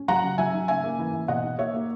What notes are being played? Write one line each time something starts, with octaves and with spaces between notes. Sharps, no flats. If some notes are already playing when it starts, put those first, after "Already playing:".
Already playing: C#4
F#3 F#5 A#5
C#3
F#3 E5 G#5
D#4
C#3 E5 G#5
A#3
E3
E3
B2 D#5 F#5
D#4
A#3 C#5 E5
A#3